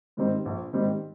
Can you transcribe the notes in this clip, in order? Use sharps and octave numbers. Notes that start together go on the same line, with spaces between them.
G#2 D#3 G3 C4
A#1
G#2 D#3 G3 C4